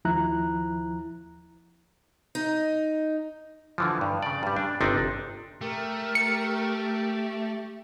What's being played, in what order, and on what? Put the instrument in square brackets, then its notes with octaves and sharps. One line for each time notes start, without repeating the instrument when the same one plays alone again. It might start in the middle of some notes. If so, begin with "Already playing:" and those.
[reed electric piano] D#2 F3 E4 A#5 F#6
[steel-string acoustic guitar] D#4
[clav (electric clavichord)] D3 E3 F3
G2
C#3 D5
G2 G3
D4
G1 C3 D4 D#4
[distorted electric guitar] A3 [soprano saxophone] G4 [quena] A#4
[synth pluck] C#7